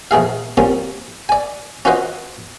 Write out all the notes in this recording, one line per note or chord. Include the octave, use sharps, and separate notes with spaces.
A#1 A3 G#4 F5
G3 A#3 C4 C#4 F4
D5 G#5
C#4 F4 F#4 B4 C5 D#5